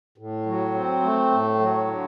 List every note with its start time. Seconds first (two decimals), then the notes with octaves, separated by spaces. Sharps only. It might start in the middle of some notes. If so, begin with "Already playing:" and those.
0.18 A2
0.46 F#3
0.74 C4
1.02 A3
1.31 A2
1.59 F#3
1.87 D3